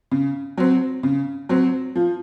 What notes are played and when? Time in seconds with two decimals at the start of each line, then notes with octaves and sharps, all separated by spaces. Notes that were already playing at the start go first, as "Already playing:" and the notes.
0.11 C#3
0.58 F#3 C4
1.03 C#3
1.49 F#3 C4
1.95 F3